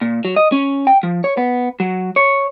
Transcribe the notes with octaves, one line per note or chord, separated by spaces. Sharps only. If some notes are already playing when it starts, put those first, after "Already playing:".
A#2
F#3
D#5
C#4
G5
F3
C#5
B3
F#3
C#5